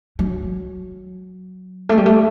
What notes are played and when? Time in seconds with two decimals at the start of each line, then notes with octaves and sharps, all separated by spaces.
0.19 F#3
1.89 A3
1.98 G3
2.06 A3